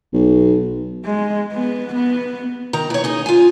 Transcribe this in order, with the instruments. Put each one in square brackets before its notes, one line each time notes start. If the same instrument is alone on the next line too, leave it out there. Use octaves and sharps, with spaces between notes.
[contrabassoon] B1
[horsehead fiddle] G#3
B3
B3
[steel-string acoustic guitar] D#3 A#5
E3 C#5
D#4 G#4
F4 G#5